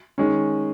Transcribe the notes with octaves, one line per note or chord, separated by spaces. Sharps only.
D#3 G#3 C#4